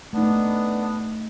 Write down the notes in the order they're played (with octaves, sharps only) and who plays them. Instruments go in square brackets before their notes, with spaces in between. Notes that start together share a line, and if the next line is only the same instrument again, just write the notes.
[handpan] A3 D#4 [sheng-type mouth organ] B3 D4